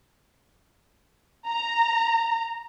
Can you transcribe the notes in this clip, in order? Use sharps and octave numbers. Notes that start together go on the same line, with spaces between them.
A#5